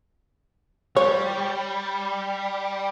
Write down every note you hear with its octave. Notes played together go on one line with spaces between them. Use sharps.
G3 C#5